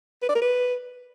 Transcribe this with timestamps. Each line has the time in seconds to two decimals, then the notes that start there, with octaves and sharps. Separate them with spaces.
0.22 B4
0.29 D5
0.35 A#4
0.42 B4